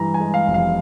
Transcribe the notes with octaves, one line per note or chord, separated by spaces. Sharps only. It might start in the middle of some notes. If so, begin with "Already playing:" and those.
Already playing: G2 E3 A#5
G#5
G#3
F5
F1
F5